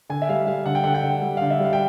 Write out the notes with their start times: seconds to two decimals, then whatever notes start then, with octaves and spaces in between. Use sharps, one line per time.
0.09 D3 G#5
0.22 E5
0.29 G3 F5
0.47 G3 F5
0.66 D3 F#5
0.75 G5
0.84 D3 F#5
0.95 G5
1.04 D3
1.22 G3
1.37 D3 F5
1.50 E5
1.60 G3 F5
1.73 G5